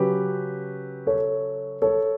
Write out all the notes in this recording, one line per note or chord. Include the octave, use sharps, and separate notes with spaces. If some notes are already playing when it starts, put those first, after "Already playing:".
Already playing: C#3 F#3 C#4 G4 B4
A4 C#5
A4 C#5